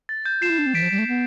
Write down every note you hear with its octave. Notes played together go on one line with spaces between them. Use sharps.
A6
G6
F4 C7 E7
E4
D4
C4
E3 B6 D7
F3
G3
A3
B3